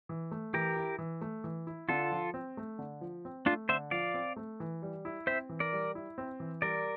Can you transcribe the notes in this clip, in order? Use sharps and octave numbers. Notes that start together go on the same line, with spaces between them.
E3
A3
E3 G4 A#4
E4
E3
A3
E3
E4
D3 F4 A4
F3
C4
A3
D3
F3
C4
A3 D4 F4
D3 C5 E5
F3 D5 F5
C4
A3
E3
G3
E4
C4 C5 E5
E3
A#4 D5
G3
E4
C4
E3
G3 A#4 D5